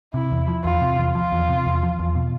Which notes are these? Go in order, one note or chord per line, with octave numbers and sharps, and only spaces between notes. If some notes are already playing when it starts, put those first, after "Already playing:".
C3 E4
E2
F3
E2 F4
C3
E2
F3 F4
E2
C3
E2
F3
E2
B2